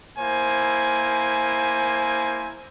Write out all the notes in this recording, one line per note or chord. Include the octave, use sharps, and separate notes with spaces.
A#3 E4 C5 G#5